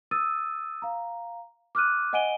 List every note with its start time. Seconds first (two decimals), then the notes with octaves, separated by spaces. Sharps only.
0.11 D#6 E6 A6 D#7
0.82 F5 A#5
1.75 D6 F6 F#6 D#7
2.13 D#5 F#5 G#5 D7 D#7 G7